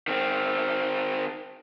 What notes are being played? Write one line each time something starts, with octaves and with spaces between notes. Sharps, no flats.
D#3 C4